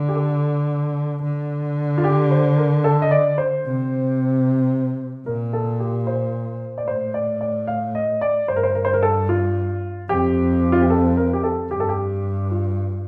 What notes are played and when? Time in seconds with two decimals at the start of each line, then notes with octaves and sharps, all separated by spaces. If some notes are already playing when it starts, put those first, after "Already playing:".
Already playing: D3
0.09 G4
0.16 A4
1.23 D3
1.98 F4
2.04 G4
2.31 C5
2.57 A#4
2.84 A4
3.02 D#5
3.11 D5
3.38 C5
3.66 C3
5.26 A#2 A#4
5.53 A4
5.80 G4
6.07 C5
6.78 D5
6.88 A2 C5
7.14 D5
7.41 D5
7.67 F5
7.95 D#5
8.21 D5
8.48 G2 C5
8.56 A#4
8.63 C5
8.75 A#4
8.85 C5
8.94 A#4
9.03 A4
9.29 F4
10.09 F2 G4
10.72 F4
10.81 G4
10.90 A4
11.17 A#4
11.33 G4
11.44 A4
11.71 G2 G4
11.80 A4
11.89 G4
12.51 F4